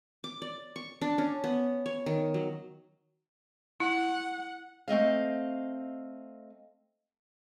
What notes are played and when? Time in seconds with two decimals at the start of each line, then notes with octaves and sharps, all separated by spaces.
0.24 D6
0.42 D5
0.76 C#6
1.01 D4
1.18 C#4
1.44 B3
1.86 C#5
2.06 D#3
2.34 F#3
3.80 E4 F#5
4.88 A3 C4 D#5 F5